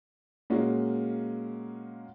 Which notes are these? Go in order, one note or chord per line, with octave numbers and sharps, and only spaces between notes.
A#2 G#3 A#3 C#4 F#4